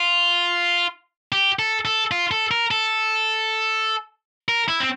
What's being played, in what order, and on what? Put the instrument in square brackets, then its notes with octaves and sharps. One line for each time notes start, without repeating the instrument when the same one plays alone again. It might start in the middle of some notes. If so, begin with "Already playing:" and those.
Already playing: [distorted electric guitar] F4
G4
A4
A4
F4
A4
A#4
A4
A#4
E4
C4